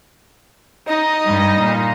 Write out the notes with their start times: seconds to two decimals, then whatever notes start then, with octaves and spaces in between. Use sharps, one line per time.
0.87 D#4 D#5
1.25 G2 G3
1.60 A#2